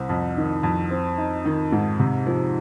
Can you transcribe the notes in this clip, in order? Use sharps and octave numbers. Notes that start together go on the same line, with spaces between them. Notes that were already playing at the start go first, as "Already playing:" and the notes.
Already playing: C2 C4
F2
D#3
F2
C4
D#4
D#3
G#2
C3
F3